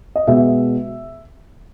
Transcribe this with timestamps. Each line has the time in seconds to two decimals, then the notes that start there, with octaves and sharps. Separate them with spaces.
0.16 D#5
0.27 B2 G#3 B3 E5